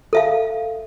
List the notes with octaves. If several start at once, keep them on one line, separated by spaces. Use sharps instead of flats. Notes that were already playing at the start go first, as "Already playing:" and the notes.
A4 E5 F5